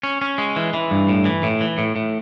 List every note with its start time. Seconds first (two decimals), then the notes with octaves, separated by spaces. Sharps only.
0.03 C#4
0.21 C#4
0.38 G#3
0.56 E3
0.74 E3
0.91 G2
1.09 A2
1.25 E3
1.43 A2
1.61 E3
1.78 A2
1.96 A2